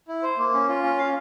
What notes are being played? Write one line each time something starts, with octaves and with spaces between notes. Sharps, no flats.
E4
C5
A#3
C#4
F4
C#4
F5